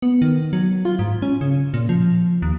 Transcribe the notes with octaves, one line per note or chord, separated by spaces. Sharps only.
B3
D#3
F#3
F4
G#2
C#4
C#3
A#2
F3
D#2